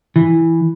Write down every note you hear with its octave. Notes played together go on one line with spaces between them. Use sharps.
E3